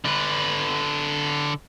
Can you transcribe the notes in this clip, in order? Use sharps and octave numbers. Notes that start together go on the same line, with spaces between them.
D3 B4